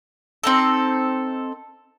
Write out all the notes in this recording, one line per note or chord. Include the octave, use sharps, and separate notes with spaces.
C4 D#4 A4